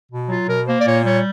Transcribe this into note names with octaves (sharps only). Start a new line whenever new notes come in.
B2
F#3 F4
B2 A#4
A#3 C5
D5
A#2 C#5
G3 C#5